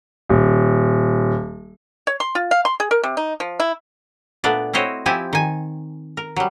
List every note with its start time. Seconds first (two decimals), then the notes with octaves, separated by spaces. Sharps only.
0.29 D#1
2.07 C#5
2.20 C6
2.35 F4
2.51 F5
2.65 C6
2.80 G#4
2.91 A#4
3.03 C3
3.17 D#4
3.40 F3
3.60 E4
4.44 A#2 A3 B3 D4 D5
4.73 C4 E4 F#4 C5 C#5 D#5
5.06 F3 C4 E4 G4 G#5 A5
5.33 D#3 G#5
6.17 A#4
6.36 F#3 G3